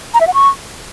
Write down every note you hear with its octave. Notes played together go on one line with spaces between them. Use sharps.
A#5
E5
F#5
C#6